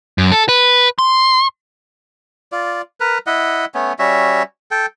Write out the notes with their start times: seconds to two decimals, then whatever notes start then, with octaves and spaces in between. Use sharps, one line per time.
0.18 F#2
0.32 A4
0.49 B4
0.99 C6
2.52 F4 D5
3.00 A#4 B4
3.27 E4 D#5 F#5
3.74 A3 B3 C#4
3.99 G3 C#4 F#4 E5
4.71 A4 G5